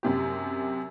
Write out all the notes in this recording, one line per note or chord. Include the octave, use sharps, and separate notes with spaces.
F#2 C3 G4